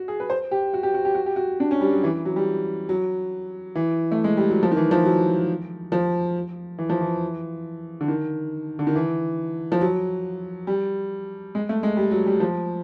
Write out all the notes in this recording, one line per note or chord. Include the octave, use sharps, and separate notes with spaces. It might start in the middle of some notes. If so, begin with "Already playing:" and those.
Already playing: F#4
G#4
B4
C5
G4
F#4
G4
F#4
G4
F#4
G4
F#4
D4
C#4
G3
F#3
E3
F#3
G3
F#3
E3
A3
G#3
G3
F#3
F3
D#3
E3
F3
F#3
F3
E3
F3
E3
D3
D#3
D3
D#3
E3
F3
F#3
G3
G#3
A3
G#3
G3
F#3
G3
F3